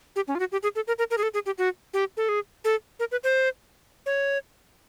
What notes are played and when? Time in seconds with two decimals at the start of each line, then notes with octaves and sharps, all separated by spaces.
0.16 G4
0.28 C#4
0.35 F4
0.39 F#4
0.52 G4
0.63 G#4
0.75 A4
0.87 A#4
0.98 A#4
1.10 A#4
1.18 G#4
1.23 A4
1.34 G#4
1.46 G4
1.58 F#4
1.93 G4
2.17 A4
2.29 G#4
2.64 A4
2.99 A#4
3.11 B4
3.24 C5
4.06 C#5